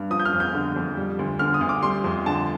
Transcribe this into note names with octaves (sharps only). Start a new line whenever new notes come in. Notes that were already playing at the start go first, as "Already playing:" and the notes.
Already playing: G2
F3 D#6
G6
F6
F2
G6
D3
F2
G3
D2
D3 F6
D#6
D2
D6
G3 C6
F2
D3 A5